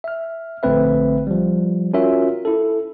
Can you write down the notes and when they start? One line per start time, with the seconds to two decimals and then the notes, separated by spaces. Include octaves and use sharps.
0.04 E5 F6
0.63 A#1 D3 A3 C4 B4 E5
1.27 F3 G3
1.94 C#4 F4 F#4 A#4 E5
2.45 E4 A4